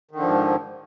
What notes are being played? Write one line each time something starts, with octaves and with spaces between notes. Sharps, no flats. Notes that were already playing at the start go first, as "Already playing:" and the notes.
G#2 D3 D#3 F3